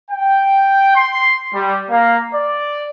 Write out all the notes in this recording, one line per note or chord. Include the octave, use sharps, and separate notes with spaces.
G5
C6
G3
A#3
D5